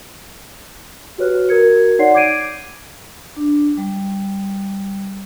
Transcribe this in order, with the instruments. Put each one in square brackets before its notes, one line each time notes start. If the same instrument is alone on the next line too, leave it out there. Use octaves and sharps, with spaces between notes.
[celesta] F#4 G4 B4 C#5 F6 F#6
F#4 A#4 G#6 C#7
D#4 C#5 D5 F#5 C6 C7
D6 G6 G#6 C7 D7 D#7
[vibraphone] D4
G3